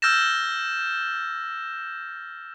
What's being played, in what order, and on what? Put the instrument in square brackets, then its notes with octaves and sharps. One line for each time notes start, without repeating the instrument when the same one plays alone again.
[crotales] E6 F6 G6 A6 A#6 E7